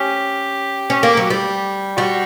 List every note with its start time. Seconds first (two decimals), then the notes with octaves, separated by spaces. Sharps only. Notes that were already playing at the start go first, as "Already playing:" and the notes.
Already playing: C#4 G4
0.90 C#4
1.03 A#3
1.17 F#3
1.30 G3
1.97 G3 F#4